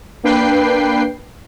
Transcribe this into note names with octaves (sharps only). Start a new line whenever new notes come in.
A#3 D4 B4 G5 C7